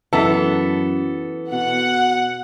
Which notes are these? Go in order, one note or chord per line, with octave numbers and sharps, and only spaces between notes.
F#2 E3 B3 A4
B2 F#5